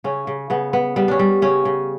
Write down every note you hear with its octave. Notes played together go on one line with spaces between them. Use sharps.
C#3 C#4
C#3
C#3 B3
B3
G3 B3
C#4 D4
G3
C#3 C#4
C#3